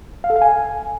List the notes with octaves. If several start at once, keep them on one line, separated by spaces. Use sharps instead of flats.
F5
A4
F5
G#5